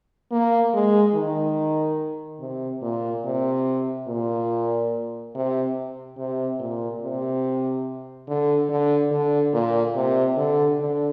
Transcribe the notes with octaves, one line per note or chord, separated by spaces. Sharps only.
A#3
G#3
D#3
C3
A#2
C3
A#2
C3
C3
A#2
C3
D3
D3
D3
A#2
C3
D3
D3